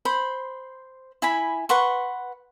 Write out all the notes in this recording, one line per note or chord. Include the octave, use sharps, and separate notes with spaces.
C5 B5 C6
E4 G#5 B5
B4 F#5 C6 C#6